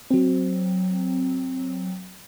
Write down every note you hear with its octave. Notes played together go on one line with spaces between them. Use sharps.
F#3 C4